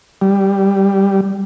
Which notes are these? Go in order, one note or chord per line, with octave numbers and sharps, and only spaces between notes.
G3